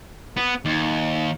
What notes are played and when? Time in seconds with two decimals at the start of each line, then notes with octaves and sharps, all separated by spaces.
0.37 B3
0.65 D#2